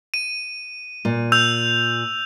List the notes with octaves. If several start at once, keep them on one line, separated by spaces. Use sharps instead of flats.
D#7
A#2
E6 G6 F7